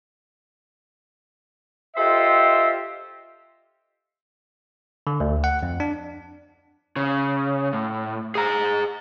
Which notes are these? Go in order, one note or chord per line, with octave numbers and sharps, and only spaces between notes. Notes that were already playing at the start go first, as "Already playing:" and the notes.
F4 G4 A4 C5 D#5 E5
D3
D2
F#5
F2
D4
C#3
A2
G#4 A#5